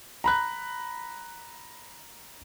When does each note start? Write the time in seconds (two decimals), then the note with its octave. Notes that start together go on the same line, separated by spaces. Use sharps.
0.24 A#5 B5 F#6